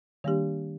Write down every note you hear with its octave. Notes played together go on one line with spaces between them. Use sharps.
D#3 G3 A#3 D4 G4